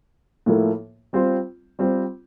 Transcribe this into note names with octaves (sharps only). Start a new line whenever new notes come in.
A2 F3 A#3 E4 A4
G3 C4 F4 C5
G3 C4 F4 C5